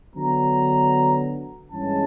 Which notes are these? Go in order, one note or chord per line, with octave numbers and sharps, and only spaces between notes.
D3 F#3 B3 A#5
G2 E3 G#3 C#4 A5